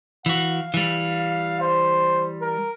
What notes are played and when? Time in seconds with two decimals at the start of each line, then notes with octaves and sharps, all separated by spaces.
0.26 E3 F#4 F5
0.74 E3 G3
1.61 C5
2.42 A#4